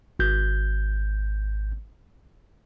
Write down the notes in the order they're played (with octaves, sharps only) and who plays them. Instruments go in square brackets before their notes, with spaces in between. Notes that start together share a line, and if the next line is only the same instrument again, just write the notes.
[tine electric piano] G#1 G6